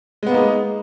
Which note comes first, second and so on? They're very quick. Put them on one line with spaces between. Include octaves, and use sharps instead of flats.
G#3 B3 A#3 D#4